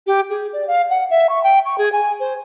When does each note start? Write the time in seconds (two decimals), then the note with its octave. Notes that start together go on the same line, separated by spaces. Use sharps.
0.07 G4
0.30 G#4
0.53 D5
0.68 F5
0.90 F#5
1.10 E5
1.29 C#6
1.44 G5
1.66 C#6
1.78 G#4
1.92 G#5
2.20 C5